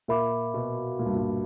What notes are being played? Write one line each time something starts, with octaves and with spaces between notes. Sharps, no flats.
A#2 A#4 E5 B5 D6
B2
A#2
G2
A#2